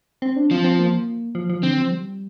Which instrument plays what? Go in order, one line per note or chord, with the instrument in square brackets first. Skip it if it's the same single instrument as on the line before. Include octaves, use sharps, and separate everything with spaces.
[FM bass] C4
D4
[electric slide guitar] F3 [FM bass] C4
[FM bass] C4
A#3
F3
F3
[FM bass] D3 [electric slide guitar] C4
[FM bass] F3
G3